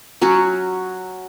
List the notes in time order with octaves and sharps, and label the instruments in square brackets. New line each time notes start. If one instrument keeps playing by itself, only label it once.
[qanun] F#3 C#4 F#4